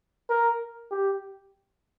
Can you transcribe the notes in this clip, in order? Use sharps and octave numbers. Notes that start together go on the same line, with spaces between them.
A#4
G4